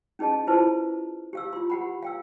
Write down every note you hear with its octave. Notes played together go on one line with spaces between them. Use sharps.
C#4 D#4 G#4 D#5 A5
E4 F4 G#4 B4 C5 A5
G4 F5 E6
F4 C6
G4 F#5 B5
F5 G5 E6